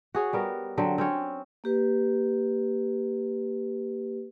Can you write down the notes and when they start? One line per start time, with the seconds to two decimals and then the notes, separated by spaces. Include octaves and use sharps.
0.15 F#4 G#4 C#5
0.33 G3 B3 A#4
0.78 D3 F#3 C4
0.98 C4 C#4 C#5
1.64 A#3 G4 B4